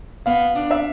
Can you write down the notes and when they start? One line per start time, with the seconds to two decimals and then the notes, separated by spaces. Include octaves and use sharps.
0.26 B3 F5
0.56 D4
0.71 E5